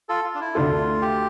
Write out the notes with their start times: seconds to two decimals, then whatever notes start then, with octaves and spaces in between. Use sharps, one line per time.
0.09 F4 A4
0.25 F4
0.35 D4
0.40 E4
0.55 D2 D3 A3 D4 F4 A4
1.02 G4